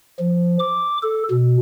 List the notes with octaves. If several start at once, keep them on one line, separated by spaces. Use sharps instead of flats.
F3
D6
A4
B2